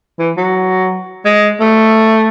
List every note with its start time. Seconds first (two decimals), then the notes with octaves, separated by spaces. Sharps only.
0.19 E3
0.37 F#3
1.25 G#3
1.60 A3